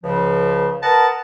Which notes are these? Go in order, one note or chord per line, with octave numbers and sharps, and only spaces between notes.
C#2 C#3 F3
A#4 B4 D#5 F#5 A5